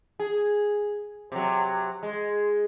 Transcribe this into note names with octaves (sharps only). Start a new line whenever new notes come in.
G#4
C3 F#3
G#3